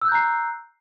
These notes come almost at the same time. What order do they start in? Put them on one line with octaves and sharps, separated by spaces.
E6 F#6 G6 A#5 C7